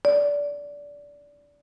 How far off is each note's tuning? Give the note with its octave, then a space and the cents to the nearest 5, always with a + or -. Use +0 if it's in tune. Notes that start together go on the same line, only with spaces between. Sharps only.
D5 -20